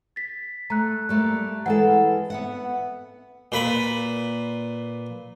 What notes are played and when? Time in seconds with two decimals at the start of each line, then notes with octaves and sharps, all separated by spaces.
0.16 A6 B6
0.70 A3 A#5 F#6
1.09 G3 A3 A#3
1.66 E3 G#3 A4 F#5
1.89 B4
2.30 B3 E5 F#5
3.52 A#2 B4 B5